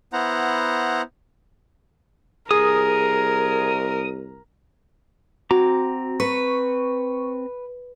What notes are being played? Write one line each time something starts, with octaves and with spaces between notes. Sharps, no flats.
B3 E4 C5 F#5 A#5
C2 G#4 A#4 D#6
C4 F#4 A#5 D6
B4 C#6